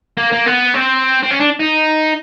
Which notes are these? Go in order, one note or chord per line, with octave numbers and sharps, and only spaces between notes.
A#3
A#3
B3
C4
C4
C#4
D4
D#4